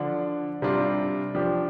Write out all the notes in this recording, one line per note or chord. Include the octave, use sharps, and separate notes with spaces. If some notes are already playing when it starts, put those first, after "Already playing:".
Already playing: D3 F3 D4
C3 G3 D4 F4
F3 D4 G4